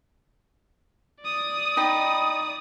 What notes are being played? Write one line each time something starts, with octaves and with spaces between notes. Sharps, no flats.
D5 D#6
D#4 G5 B5